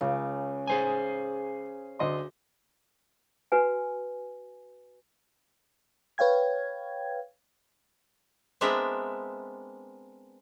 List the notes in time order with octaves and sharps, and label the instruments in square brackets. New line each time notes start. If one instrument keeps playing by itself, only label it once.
[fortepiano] C#2 [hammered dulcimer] C#3
[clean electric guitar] G#4 C5 G#5
[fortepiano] D2 D#5 C6
[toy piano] F#4 B4 G#5
[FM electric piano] B4 C#5 F5 G5 G#6
[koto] G#3 B3 C4 D4 A#4 E5